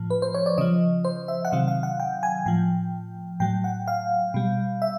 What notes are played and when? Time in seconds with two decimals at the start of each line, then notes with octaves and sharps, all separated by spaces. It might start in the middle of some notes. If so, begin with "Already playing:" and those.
Already playing: A2 F3
0.10 B4
0.22 C5
0.34 C#5
0.46 D5
0.58 C#3 F3 D#5
1.05 C5
1.28 E5
1.45 F#5
1.52 C3 D#3 F#3 F5
1.68 F5
1.83 F#5
2.00 G5
2.23 G#5
2.46 A2 F3 G5
3.40 A2 F#3 G5
3.64 F#5
3.88 F5
4.34 B2 G3
4.82 E5